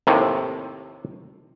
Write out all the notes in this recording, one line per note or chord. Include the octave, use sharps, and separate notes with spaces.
D#2 A2 C3